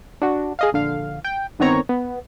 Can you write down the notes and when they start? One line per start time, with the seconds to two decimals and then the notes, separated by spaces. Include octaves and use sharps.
0.22 D4 F#4
0.59 G#4 D#5 F5
0.73 A#1 D3 F5
1.24 G5
1.59 G1 D#3 B3 C4 C#5 A#5
1.89 B3